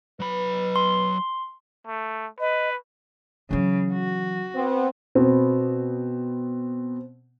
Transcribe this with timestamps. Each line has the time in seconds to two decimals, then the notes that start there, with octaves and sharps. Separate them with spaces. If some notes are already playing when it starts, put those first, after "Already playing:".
0.20 F#3 B4 B5
0.76 C6
1.87 A3
2.40 B4 D#5
3.51 C#3 E3 F#3
3.93 F#4
4.55 B3 C4
5.15 B2 B3 C4